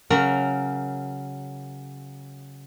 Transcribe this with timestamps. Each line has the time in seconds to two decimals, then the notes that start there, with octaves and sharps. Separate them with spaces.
0.10 C#3 F#3 A#4